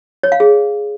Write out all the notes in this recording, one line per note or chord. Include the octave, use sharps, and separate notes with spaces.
C#5
F5
G#4